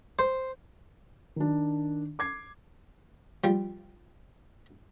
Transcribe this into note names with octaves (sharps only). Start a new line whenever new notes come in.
C5
D#3 D4
D6 G#6 C7
F3 G3